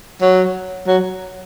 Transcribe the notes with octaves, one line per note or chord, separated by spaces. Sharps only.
F#3
F#3